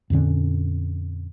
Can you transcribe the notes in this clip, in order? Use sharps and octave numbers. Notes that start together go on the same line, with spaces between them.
F2 A#2 D3 C#4